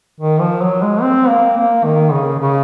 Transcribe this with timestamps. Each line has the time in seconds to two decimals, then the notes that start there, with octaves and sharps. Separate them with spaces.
0.20 D#3
0.40 F3
0.62 F#3
0.82 G#3
1.02 C4
1.29 A#3
1.57 A#3
1.85 D#3
2.12 C#3
2.39 C#3